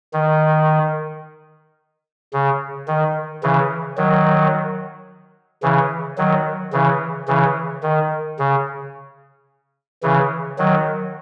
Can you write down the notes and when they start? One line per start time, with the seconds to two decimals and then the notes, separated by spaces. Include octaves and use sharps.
0.13 D#3
2.33 C#3
2.88 D#3
3.43 C#3 E3
3.97 D#3 F#3
5.63 C#3 E3
6.18 D#3 F#3
6.73 C#3 E3
7.28 C#3 E3
7.83 D#3
8.39 C#3
10.03 C#3 E3
10.58 D#3 F#3